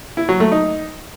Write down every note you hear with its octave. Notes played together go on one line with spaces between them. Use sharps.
E4
F#3
A3
D#4